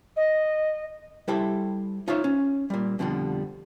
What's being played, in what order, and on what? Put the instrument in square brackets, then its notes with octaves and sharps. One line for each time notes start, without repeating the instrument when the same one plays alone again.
[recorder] D#5
[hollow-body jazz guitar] G3 E4 G4 A4 C5 E5
D#4 F4 C5 C#5 E5 F5
C#4
A#2 G3
F2 B2 D3 F3 G3